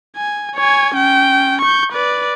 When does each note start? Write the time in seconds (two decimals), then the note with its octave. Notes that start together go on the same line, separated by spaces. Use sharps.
0.16 G#5
0.57 C#5 G#5
0.95 C#4 G5
1.62 C#6 G6
1.93 B4 D5